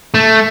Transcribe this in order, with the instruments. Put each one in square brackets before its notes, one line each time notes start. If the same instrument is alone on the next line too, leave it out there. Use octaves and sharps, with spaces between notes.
[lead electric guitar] A3